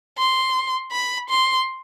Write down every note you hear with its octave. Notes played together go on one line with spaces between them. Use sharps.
C6
B5
C6